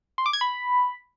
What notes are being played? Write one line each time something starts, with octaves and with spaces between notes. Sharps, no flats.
C6
D6
G#6
B5